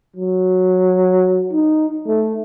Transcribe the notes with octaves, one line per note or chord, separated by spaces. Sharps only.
F#3
D#4
A3